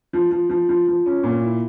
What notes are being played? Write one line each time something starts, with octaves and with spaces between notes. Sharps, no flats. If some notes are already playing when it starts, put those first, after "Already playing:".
F3
F3
F3
F3
F3
C#4
A#2
E4